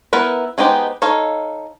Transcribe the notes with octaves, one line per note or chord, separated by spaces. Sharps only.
B3 E4 A#4 B4
G#3 B3 D#4 G4 C5
D#4 A4 C#5 F5